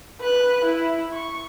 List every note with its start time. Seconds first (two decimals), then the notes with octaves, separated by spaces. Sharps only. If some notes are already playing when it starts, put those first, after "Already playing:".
0.20 B4 F#6
0.64 E4
1.13 C#6